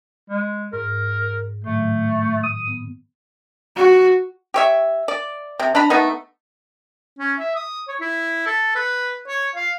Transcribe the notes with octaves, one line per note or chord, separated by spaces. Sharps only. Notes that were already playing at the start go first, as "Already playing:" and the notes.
G#3
G#2 A#4
A2 D#3 F#3 A3
D#6
B3
F#4
G4 C#5 E5
D5
C3
D4 A#5 B5
A3 B3 D#4
C#4
E5
D#6
C#5
E4
A4
B4
C#5
F5